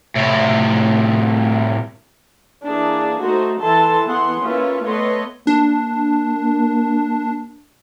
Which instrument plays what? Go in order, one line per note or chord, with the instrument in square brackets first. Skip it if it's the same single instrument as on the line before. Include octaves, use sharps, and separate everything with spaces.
[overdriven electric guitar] A2 C3
[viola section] E3 A#3 D4 G#4
A3 D#4 F#4 C5
E3 A4 A5 C6
E3 B3 G#4 F#5 C6
A#3 C#4 E4 F4 B4
A3 B3 B4 C#5 D#5 C6
[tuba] A#3 [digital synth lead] D4